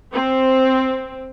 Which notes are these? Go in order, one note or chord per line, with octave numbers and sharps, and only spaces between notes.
C4